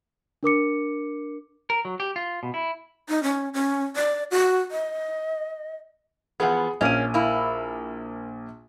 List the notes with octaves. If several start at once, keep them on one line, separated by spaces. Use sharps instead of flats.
D4 A#4 D6 C#7
A#4
F#3
G4
F4
B2
E4
D#4
C#4
C#4
D5
F#4
D#5
E2 F3 B3 G#4 F#5
A#1 A#3 C#4 D#7
A#3 E4